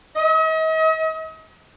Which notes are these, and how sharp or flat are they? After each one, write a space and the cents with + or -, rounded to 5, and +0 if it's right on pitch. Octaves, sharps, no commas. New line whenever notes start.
D#5 +40